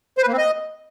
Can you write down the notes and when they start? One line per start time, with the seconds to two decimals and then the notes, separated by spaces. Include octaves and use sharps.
0.18 C5
0.23 B4
0.28 A#3
0.33 C4
0.38 D#5